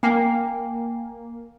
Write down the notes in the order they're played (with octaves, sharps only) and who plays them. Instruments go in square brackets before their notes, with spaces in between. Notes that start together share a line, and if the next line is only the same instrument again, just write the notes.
[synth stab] A#3 [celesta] G5 G#5 C7